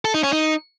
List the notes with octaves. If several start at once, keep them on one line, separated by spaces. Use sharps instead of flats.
A4
D#4
C#4
D#4